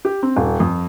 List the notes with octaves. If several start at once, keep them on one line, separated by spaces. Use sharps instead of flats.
G4
C4
D#1
F2